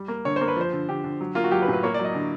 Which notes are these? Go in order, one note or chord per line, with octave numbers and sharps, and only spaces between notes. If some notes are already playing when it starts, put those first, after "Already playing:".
Already playing: G3
A#3
D3 C#5
A#3 C5
B4
F3 C5
D3
D3 G4
D3
F#3
A#3 F4
F#4
F#3 G4
B4
A2
B4
A#3 C#5
D5
F#3
D#5
D3